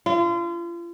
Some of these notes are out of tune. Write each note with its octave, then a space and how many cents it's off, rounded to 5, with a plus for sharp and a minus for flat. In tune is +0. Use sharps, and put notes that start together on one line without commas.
F4 -35